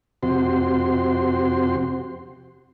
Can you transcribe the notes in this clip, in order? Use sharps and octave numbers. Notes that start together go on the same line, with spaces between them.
F2 C3 C4 F#4 G4 C6